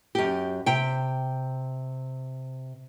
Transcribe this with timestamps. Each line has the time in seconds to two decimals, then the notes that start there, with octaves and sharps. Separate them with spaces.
0.15 F#2 G4
0.66 C3 G5